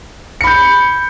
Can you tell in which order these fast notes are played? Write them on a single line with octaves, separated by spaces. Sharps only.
C#7 B5 G6